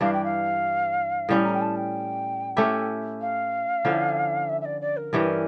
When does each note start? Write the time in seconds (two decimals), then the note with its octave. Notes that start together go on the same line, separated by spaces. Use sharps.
0.01 G2 E3 G3 D4 F5
0.13 G5
0.24 F5
1.29 A2 G3 C#4
1.44 A#5
1.54 G5
1.61 A5
1.76 G5
2.57 A3 C#4 E4 G4
3.21 F5
3.85 D3 F3 C#4 E4
4.49 E5
4.61 E5
4.65 D5
4.81 D5
4.96 A#4
5.13 G2 E3 G3 C#4